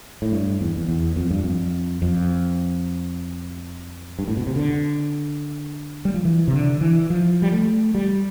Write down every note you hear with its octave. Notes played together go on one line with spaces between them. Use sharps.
A2
G2
E2
E2
E2
F2
G2
F2
F2
G2
A2
B2
C3
D3
G3
F3
E3
C3
D3
E3
F3
G3
A3
G3